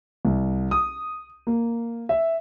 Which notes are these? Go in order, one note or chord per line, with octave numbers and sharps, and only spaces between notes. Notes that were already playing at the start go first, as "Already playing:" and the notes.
C2
D#6
A#3
E5